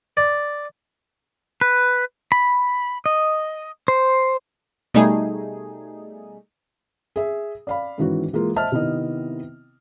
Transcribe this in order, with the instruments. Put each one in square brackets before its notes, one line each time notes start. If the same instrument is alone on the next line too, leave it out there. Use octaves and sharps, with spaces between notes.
[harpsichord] D5
[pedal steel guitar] B4
B5
D#5
C5
[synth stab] B2 G3 A3 D#4 G#4
[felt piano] G#4 E5
D5 F5 B5
G#2 D#3 E3 C#4 F#4
E3 G#3 A#3 F4
C5 D#5 E5 A5 F6
C3 D#3 B3 E4 D#5